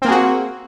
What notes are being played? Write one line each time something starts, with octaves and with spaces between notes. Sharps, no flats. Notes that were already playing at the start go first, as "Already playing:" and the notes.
A#3 C4 F#4 G#4